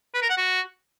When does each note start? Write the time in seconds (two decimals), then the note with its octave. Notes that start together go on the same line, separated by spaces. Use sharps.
0.15 B4
0.22 A#4
0.30 F#5
0.37 F#4